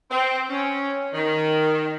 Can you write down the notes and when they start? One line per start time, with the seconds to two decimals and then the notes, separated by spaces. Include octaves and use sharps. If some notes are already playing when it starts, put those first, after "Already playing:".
0.11 C4
0.50 C#4
1.13 D#3